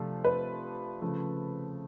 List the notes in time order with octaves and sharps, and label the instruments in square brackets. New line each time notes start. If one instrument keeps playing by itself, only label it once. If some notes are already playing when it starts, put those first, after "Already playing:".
Already playing: [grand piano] C3 F3 A3 D4 F4
[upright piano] B4
[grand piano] C#3 F3 A3